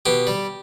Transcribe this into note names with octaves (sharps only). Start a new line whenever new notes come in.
B2 G4
G3